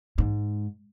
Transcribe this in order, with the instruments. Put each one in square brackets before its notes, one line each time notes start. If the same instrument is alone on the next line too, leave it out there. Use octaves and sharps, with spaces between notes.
[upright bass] G#2